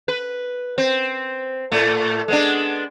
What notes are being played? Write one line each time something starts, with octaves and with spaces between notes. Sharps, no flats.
B4
C4
A2 A3
G#3 B3 D4